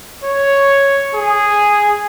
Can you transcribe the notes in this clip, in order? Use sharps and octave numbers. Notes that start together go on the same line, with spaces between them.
C#5
G#4